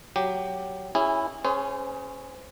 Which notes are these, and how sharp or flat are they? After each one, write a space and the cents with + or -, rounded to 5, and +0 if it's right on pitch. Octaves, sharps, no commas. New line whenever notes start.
F#3 +10 G4 +0
C#4 +0 E4 +0 G#4 -25
C#4 -10 G#4 +20 C5 -35